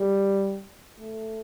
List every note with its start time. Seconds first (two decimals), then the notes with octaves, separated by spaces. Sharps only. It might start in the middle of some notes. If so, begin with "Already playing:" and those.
Already playing: G3
0.98 A3